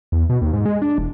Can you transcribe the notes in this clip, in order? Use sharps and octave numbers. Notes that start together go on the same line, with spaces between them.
E2
B2
D#2
G#2
G#3
D4
E1